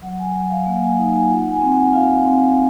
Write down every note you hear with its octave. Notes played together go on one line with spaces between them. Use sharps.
F#3 F#5
G#5
F#3 F#5
F5
A#3 F#5
G#5
D#4 F#5
G#5
F4 F#5
G#5
C4
F#5
F4 F5
C4